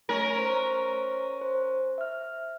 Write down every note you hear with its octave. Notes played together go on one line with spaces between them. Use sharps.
A3 C#4 A#4
C5
C5
E5 F6